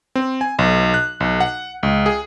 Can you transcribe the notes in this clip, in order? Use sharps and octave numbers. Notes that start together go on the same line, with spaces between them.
C4
G#5
B1
F#6
B1
F#5
C#2
G#4